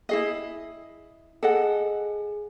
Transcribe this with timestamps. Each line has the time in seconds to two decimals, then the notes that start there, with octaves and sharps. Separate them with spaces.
0.09 E4 G#4 D#5
1.43 G#4 A4 D#5 F#5